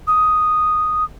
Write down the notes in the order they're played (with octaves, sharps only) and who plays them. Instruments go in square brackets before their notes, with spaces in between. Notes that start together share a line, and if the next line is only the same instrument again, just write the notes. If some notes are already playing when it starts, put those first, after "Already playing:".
[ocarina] D#6